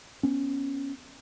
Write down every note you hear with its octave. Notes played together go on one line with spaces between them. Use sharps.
B3 C#4